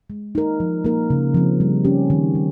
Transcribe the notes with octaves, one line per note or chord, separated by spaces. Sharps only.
G#3
D#4 A#4
F3
A#3 D#4 A#4
C#3
F3 C4
G3
C#4 G4
D#3
G3